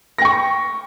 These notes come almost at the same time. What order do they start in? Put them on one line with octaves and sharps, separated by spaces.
A#6 G5 C#6